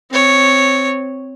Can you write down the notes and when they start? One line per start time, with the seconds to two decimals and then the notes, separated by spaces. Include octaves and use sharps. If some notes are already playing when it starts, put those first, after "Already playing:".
0.11 C4 C#5